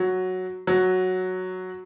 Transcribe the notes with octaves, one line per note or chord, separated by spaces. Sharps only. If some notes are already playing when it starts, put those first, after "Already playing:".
Already playing: F#3
F#3